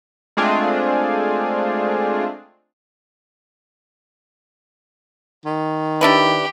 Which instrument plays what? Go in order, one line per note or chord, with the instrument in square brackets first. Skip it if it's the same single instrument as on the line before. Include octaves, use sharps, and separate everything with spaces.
[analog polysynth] G#3 A3 C4 D4 F4 G#4
[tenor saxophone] D#3
[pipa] D4 E4 B4 [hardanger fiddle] G4